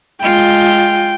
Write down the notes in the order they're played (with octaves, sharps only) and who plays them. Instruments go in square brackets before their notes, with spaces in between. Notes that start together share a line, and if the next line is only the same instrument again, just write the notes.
[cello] G#3 F4 [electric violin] G5